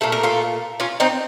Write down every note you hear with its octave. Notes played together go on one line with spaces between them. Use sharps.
A#2 A3 A4
A#4
F4 A4
C#4 F4
C4 D#4